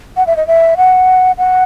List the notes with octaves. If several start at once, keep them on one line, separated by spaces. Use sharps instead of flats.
F#5
E5
D#5
E5
F#5
F#5